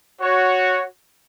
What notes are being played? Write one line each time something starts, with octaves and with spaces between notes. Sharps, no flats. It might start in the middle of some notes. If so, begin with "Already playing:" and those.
F#4 C#5